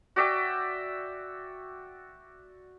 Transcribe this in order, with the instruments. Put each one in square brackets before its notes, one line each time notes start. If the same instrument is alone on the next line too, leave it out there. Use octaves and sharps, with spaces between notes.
[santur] F#4 D5 E5 G5